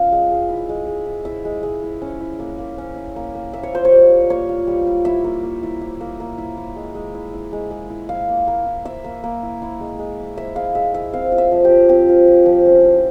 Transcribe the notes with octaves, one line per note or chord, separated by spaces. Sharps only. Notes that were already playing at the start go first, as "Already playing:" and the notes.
Already playing: C#4 F4 F5
G#3
G#3
E4
G#3
G#3
E4
E4 E5
G#3
G#3
E4
C#4
E4
A#3
A#3
C#4
E4
A#3
A#3
A#3 E5
C#5
F4 C5
C#5
G3
G3
A#3 C#5
F4
G3
G3
E4 E5
A#3
A#3
E4
E4
A#3
A#3
E4
E4
G#3
G#3
E4
E4
G#3
G#3
E4
E4 F5
A#3
A#3
E4
E4 E5
A#3
A#3
E4
E4
G#3
G#3
E4
E4 E5
G#3 F5
G#3 E5
E4 E5
C4 F5
F4
E5
F3
G4
F3
C4 G4
F4
F3
F3
C#4
E4